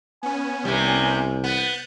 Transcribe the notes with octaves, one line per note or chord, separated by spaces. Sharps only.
B3 C#4 G#5
C2 C3 G3
B3 F#6 G6 A6